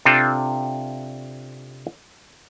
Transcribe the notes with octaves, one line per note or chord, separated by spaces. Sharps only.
C3 C4 D4 F4 A4